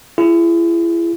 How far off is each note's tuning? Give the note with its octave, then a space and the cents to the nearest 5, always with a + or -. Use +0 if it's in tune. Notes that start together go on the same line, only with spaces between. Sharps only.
E4 +35 G#4 +0